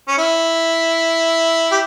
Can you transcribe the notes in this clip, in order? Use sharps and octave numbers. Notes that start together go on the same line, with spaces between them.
C#4
E4
G4